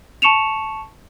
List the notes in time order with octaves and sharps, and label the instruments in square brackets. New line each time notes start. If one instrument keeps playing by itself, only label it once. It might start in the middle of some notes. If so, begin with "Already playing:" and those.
[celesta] A5 C#6 C#7 E7 F7